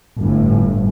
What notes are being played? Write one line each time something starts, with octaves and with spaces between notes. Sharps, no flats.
G1 A2